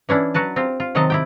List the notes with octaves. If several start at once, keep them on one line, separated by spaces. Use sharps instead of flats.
E3 C#4 D4 E4
F#3 F#4 B4 A5
C4 F4 G4
F4
C3 D#3 F#3 C4 D#5 A5
E4 G4 G5